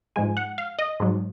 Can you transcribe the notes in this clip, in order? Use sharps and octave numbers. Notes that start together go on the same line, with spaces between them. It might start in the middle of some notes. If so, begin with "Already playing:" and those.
G#2 F3 G#3 G#5
F#5
F5
D#5
G#2 F#3